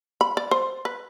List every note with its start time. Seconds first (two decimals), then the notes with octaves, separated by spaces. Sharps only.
0.21 B5
0.37 D5
0.51 C5
0.85 B4